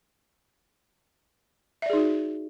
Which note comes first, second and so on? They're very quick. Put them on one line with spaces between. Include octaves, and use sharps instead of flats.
E5 D5 G#4 D#4 F#4